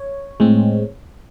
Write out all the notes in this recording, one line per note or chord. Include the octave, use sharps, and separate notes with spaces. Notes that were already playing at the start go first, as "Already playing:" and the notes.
Already playing: C#5
A2 G#3 C4